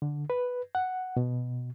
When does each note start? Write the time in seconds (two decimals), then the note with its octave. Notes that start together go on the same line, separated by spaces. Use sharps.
0.02 D3
0.30 B4
0.75 F#5
1.17 B2